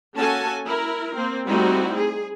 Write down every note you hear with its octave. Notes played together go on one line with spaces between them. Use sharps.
A#3 C#4 F#4 A4 G#5 A5
E4 A#4
A#3 C4
G3 A3 C4 D#4 E4 F#4
G#4